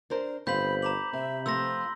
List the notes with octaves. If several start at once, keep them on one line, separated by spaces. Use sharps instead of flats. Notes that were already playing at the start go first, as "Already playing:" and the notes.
D4 A#4 C5
G1 C4 F4 C5 B5 G6 B6 F#7
A#5 B5 D6 F#7
C3 C4 E5
F3 A3 C4 C6 E6 A#6